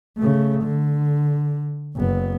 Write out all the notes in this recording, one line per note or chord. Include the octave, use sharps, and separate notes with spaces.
C#3 A3
D3
F#1 B3